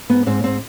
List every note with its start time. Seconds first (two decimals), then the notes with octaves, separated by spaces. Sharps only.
0.09 G#2 B3
0.26 G#2 C4
0.44 G#2 C4